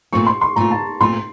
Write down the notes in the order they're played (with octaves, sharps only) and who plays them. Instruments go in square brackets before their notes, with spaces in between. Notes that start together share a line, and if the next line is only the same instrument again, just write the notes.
[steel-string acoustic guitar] A#2 A3 C4 F4 [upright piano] C#6
[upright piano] C6
C6
[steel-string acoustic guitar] A#2 A3 C4 F4 [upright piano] A#5
[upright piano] A5
[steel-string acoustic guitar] A#2 A3 C4 F4 [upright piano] C6